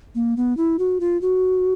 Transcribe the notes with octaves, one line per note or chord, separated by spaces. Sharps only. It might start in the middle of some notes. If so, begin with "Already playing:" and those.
A#3
B3
E4
F#4
F4
F#4